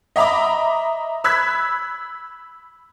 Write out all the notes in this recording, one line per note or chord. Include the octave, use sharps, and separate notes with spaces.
D#5 E5 A#5 B5 D6
B5 E6 F#6 G#6 B6